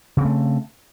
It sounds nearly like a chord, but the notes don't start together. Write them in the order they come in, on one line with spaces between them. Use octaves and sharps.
C#3 C4 A3